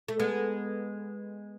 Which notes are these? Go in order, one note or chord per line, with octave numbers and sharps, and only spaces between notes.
A3
G#3 B3